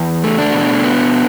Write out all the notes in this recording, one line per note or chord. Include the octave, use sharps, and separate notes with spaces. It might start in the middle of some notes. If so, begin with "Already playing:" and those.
Already playing: E2
A3
D4
B2
B3